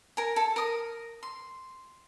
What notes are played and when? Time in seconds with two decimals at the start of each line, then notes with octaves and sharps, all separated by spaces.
0.17 A#4 G#5
0.36 A4
0.56 A#4 D#6
1.23 C6